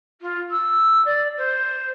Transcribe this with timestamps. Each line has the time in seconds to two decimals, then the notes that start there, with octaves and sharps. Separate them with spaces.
0.21 F4
0.50 E6
1.05 D5
1.37 C5